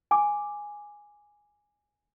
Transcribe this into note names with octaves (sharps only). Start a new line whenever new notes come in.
G#5 D6